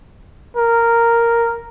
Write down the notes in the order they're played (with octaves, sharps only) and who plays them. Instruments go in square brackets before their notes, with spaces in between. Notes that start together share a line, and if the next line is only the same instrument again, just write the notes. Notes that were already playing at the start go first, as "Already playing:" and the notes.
[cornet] A#4